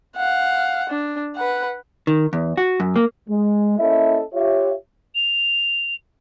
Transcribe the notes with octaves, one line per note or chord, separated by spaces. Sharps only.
F5 F#5
D4
B4 F#5
D#3
E2
F#4
F#2
A#3
G#3
A#3 C#4 E4 A4 D#5 E5
F4 G4 C#5 E5
F7